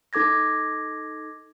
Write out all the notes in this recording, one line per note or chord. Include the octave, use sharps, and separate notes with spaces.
D#4 A4 D6 G#6 A#6